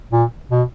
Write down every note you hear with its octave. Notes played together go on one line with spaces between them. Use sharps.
A#2
B2